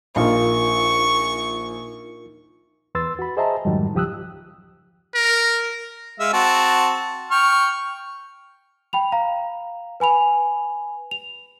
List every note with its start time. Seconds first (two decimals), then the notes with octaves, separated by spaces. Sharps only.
0.16 A#1 D#4 F4 A#4 C#6
2.95 E2 B4 C6 E6 A6
3.19 F#4 B5
3.37 G#4 C5 D#5 E5 A5 A#5
3.65 F2 G#2 D#3 F#3 G3
3.95 C#2 F3 G4 D#6 E6 F#6
5.14 A#4
6.20 G#3 E5 F5
6.33 C4 F#4 A5
7.31 G5 C#6 F6
8.93 G5 B5 F7
9.12 F5 A#5
10.00 B4 G#5 B5 F7
11.11 F7